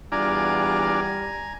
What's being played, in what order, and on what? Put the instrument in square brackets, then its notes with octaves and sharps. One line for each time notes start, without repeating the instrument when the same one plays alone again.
[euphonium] E2 [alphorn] G3 [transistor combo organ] D4 F4 D5 [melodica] G#5 A#5